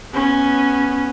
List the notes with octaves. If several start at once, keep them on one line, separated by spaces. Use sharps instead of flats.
B3 C#4